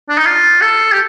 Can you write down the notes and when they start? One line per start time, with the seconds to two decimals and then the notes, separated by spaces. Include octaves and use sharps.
0.09 D4
0.18 D#4
0.26 F4
0.61 A4
0.93 G4